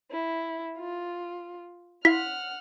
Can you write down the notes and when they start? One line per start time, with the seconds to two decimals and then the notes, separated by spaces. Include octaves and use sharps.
0.11 E4
0.78 F4
2.05 E4 F5 F#5 C6 F6 B6